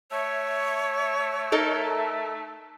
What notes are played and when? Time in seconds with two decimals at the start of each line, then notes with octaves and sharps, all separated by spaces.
0.11 A3 C#5 E5
1.52 D#4 A4 A#4